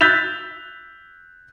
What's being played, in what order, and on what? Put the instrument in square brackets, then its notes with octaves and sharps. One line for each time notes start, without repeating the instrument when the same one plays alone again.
[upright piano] E6 F#6 G6 A6 B6 F7